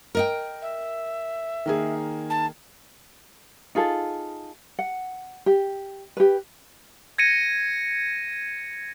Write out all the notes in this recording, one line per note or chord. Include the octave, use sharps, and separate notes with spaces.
A#4 D#5 G5
E5
D#3 A#3 G#4
A5
D#4 F4 G#4 A4
F#5
G4
G4 B4
G#6 A#6 C#7 D#7